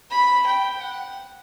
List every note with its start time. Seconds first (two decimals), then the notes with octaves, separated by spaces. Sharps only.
0.11 B5
0.47 G5
0.82 F#5